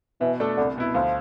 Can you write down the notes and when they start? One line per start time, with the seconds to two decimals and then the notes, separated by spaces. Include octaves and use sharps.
0.21 B2 E3
0.40 A3 D4 A4
0.57 C2 D3
0.76 B2 B3 E4
0.94 D2 F3